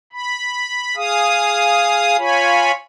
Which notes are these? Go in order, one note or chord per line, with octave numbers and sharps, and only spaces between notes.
B5
G#4 F5 D#6
F4 C#5 G#5 B5